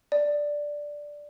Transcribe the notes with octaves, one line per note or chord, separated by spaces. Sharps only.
D5